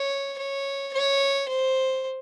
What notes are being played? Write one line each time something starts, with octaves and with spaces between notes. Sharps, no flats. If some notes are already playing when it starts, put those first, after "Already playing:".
Already playing: C#5
C#5
C#5
C5